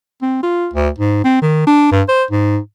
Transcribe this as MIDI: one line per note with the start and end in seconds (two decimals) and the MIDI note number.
0.22 0.39 60
0.43 0.68 65
0.73 0.88 38
0.98 1.23 44
1.24 1.37 60
1.42 1.66 51
1.67 1.88 62
1.92 2.02 43
2.08 2.24 72
2.31 2.58 44